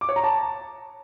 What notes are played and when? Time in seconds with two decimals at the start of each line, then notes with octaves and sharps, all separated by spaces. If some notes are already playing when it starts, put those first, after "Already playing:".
0.01 D6
0.09 C#5
0.16 A#5
0.24 A5